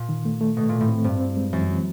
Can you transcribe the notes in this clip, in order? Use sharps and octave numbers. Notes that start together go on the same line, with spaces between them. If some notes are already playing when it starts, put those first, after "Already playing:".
Already playing: A#2
D#3
A3
A3
B2 A3
A#2 A3
A2
C4
G2 C4
C4
G#3
F#2 E3
E3